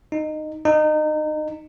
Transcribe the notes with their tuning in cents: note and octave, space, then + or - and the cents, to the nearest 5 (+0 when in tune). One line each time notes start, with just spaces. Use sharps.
D#4 -15
D#4 -25